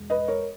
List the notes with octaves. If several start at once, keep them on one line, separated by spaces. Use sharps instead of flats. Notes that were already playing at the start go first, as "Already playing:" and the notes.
Already playing: E1
B4 D#5
A#4 C#5